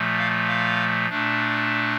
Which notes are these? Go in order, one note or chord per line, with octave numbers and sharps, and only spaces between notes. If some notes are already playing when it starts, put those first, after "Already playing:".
Already playing: A#2 F3 A3
F5
F5
A#2 A3 D4